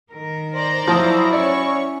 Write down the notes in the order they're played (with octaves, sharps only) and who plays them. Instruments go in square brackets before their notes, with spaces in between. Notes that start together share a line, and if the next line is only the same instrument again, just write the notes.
[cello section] D#3 A#4
[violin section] C5 D5 A#5
[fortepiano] F3 [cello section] F#3 E4 F#4 [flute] D#6
[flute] C#4 [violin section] C#5 C#6 [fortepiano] D5